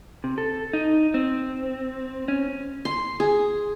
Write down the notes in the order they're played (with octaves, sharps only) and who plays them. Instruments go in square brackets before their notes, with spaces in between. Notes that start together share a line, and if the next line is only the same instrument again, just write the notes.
[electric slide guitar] C3
A4
D#4
C4
C#4
[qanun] C6
G#4